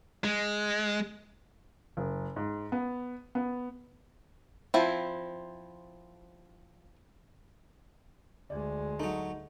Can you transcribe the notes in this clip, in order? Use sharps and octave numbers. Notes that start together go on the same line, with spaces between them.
G#3
F#1
G#2
B3
B3
F3 C4 E4
D2 G#3 D5
F#3 A3 D#4